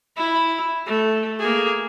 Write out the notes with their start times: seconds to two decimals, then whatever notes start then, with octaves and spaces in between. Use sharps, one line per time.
0.16 E4 B5
0.86 A3
1.39 A#3 G#4